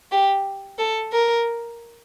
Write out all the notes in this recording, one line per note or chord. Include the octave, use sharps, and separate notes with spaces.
G4
A4
A#4